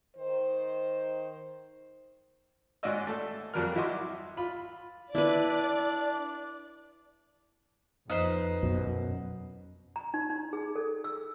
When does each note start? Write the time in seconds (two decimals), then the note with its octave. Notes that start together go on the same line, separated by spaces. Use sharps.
0.15 D#3 C5
2.83 G#2 C#4 F#4 D5 D#5 E6
3.07 A3 A4
3.54 F2 F#3 G3 A#4 F6
3.75 E4 F#4 D#5 C6 D6
4.37 F4 B5
5.15 D4 E4 B4 D5
8.10 F2 D#4 B4 C5
8.63 F#2 B2
9.96 A#5
10.14 D#4
10.30 D#4
10.53 G#4
10.76 A4
11.04 E6